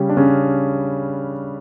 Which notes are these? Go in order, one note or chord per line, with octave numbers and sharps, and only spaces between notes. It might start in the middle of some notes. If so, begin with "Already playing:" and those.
Already playing: C#3 G3 C#4 G4
D4
C#3 C#4